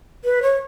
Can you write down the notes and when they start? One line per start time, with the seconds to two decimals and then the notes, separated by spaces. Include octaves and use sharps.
0.24 B4
0.42 C#5